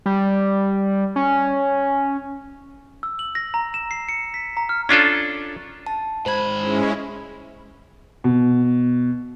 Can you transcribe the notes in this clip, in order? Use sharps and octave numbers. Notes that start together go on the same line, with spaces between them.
G3
C#4
E6
F#7
A#6
A#5
E7
C7
C#7
B6
A#5
F6
C#4 D4 F4 A4
A5
G#2 C5 B5 G#6
G#3 C#4 E4
B2